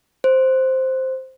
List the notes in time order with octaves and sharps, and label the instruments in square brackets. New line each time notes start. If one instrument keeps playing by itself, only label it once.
[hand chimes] C5